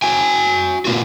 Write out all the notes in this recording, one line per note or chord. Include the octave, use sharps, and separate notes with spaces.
F#4 G5 G#5
A#2 A#3 F4 F#4